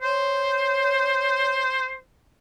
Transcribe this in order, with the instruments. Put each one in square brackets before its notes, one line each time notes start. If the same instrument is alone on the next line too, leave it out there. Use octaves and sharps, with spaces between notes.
[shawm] C5 [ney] C#5